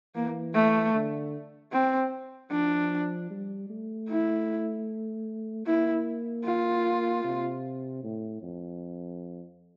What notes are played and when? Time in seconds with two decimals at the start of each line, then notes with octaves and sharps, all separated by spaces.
0.15 E3 A#3
0.54 A3
0.94 D3
1.73 C4
2.51 F3 D4
3.30 G3
3.70 A3
4.09 E4
5.66 A#3 E4
6.45 F4
7.24 C3
8.04 A2
8.42 F2